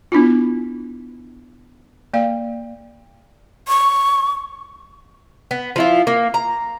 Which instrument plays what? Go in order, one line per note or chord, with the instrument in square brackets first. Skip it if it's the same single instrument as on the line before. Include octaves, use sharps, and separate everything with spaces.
[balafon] B3 D4 E4 F4
A#3 D5 F5
[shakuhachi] C#6
[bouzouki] B3
F3 E4 F4
A#3
A#5